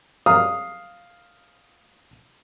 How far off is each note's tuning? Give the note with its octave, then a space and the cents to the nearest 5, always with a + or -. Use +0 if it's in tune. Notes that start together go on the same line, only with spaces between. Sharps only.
F5 +0 D#6 +0